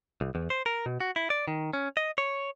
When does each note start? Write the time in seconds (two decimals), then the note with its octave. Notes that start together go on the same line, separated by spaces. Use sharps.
0.21 C2
0.35 E2
0.50 C5
0.66 A#4
0.86 B2
1.00 F#4
1.16 E4
1.30 D5
1.48 D#3
1.73 C#4
1.97 D#5
2.18 C#5